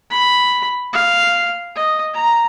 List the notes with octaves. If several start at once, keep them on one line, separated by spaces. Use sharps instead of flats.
B5
F5
D#5
A#5